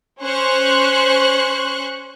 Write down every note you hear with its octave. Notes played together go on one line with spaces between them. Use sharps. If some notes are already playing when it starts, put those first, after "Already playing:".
C#4 C5 C#6 F#6